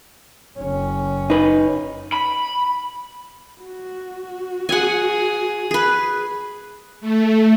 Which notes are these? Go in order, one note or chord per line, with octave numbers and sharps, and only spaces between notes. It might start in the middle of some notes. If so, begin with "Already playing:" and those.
F#1 C#4
D#4 B4
B5
F#4
G#4 F#5 G#5
G#4 B4
A3